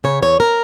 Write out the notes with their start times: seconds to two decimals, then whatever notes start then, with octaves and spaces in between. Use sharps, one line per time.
0.04 C#3 C#5
0.22 E2 C#5
0.40 A#4